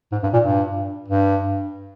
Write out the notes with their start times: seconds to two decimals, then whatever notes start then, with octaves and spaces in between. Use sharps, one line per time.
0.12 G#2
0.23 G2
0.33 A#2
0.43 G2
1.09 G2